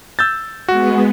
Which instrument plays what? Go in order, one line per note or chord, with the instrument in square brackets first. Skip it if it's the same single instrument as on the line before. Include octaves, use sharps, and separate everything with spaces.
[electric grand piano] E6 G6 A6
[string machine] G#3 B3 [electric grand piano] F#4